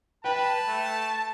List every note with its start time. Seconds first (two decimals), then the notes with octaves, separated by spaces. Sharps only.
0.24 B4 G5 A5
0.68 A3